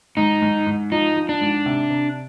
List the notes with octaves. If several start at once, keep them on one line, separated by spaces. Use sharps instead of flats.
G#2 D#4
G#2
G#2
F3 D#4
F3
D4
G#2
C3
C3